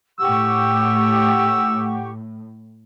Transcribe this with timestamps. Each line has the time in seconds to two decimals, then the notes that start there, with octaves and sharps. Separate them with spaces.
0.19 A2 G4 F#5 C#6 E6